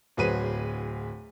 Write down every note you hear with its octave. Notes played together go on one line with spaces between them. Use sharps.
D1 F#3 G#4 B4 C5 D#7